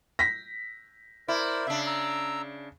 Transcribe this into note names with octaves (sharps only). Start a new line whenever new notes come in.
A#6 B6
E4 A#4 C5 D5
C#3 D4 E5
A#5 E6